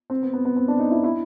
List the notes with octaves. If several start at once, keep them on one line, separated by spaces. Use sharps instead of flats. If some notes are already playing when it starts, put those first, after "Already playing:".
C4
B3
B3
B3
C4
D4
D#4
E4
E4